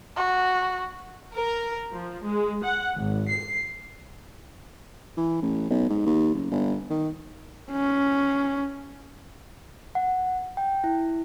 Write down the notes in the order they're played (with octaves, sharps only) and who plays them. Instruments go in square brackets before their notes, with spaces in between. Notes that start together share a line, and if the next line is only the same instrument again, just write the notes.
[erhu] F#4
[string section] A#4
F3
G#3
F#5
G#1
C7
[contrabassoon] E3
A1
B1
G#2
D#2
F#1
G1
D#3
[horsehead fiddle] C#4
[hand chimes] F#5
G5
E4